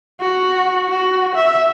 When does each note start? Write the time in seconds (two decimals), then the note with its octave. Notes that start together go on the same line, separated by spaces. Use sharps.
0.21 F#4
0.89 F#4
1.35 E5